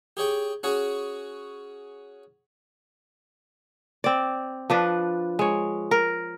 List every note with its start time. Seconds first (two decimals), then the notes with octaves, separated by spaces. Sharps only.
0.17 G4 G#4 C#5 G5
0.63 C#4 F#4 G#4 C#5
4.04 C4 D5
4.70 F3 D4 B4
5.39 G#3 C#5
5.91 A#4